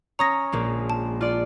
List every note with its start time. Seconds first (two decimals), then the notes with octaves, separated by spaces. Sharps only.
0.19 C#4 C#5 A#5 D#6 A#6
0.52 A#1 G#3 A#3
0.90 A5
1.21 F4 D5